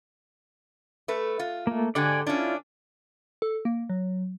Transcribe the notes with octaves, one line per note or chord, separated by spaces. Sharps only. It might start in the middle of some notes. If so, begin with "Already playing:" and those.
A3 B4
F4
A3 A#3
G#2 D3 G4 D5 G#5
C#4 D4 E4 F4
A4
A#3
F#3